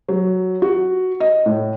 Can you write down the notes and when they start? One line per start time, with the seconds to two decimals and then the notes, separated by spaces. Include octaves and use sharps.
0.08 F#3
0.62 F#4
1.20 D#5
1.46 A2